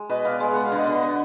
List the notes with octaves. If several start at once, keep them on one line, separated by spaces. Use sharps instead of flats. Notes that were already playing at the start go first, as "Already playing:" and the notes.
Already playing: G#3
B2 B4 D#5
B3 D5 F5
G#3
B3 F#5
F5
D3
D#5 F#5
D3
B3